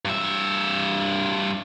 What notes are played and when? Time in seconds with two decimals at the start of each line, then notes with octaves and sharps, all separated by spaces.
0.05 G2 E5